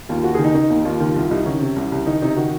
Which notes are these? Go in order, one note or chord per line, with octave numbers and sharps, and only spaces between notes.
D#2 F4
D#2 F#4
D#3 G#4
D#4
D#3 D#4
D#2
D#2 F4
D#3 F4
C2 F4
C2 D#4
D#3 C#4
C3
C2
C2
D#3 D#4
C3 D#4
D#3 F#4